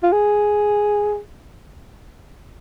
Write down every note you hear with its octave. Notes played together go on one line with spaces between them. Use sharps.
F4
G#4